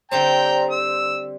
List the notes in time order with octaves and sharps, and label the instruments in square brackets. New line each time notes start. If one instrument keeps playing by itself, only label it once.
[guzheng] D3 G3 C4 [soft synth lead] C5 [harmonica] G5 A#5
[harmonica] E6